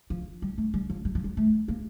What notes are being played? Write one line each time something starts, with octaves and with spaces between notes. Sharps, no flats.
F3
G3
A3
G3
F3
G3
F3
G3
A3
A#3